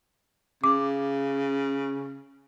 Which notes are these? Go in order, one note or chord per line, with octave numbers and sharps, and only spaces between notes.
C#3 D6